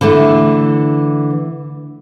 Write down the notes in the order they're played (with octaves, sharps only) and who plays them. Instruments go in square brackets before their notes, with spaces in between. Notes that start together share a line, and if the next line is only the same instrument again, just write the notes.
[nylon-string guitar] D3 E3 A3